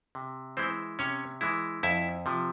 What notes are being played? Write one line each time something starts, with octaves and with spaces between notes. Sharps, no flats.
C3
E3 G#3 C4 E4 C5
C3 C#4 C#5
E3 G#3 E4
F2 E4 E5
C3 F3